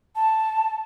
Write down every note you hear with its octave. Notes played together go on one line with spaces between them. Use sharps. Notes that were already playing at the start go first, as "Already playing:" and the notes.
A5